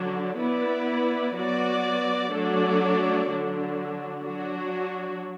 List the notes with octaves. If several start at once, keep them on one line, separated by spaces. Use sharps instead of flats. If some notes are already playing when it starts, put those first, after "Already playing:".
Already playing: D3 F#3 D4
B3 E4 B4 D5
F#3 B3 F#4 D5
F#3 A3 D4 A4 D5
D3 F#3 D4
F#3 D4 F#4